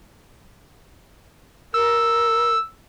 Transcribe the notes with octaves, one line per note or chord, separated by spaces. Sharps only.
A#4 E6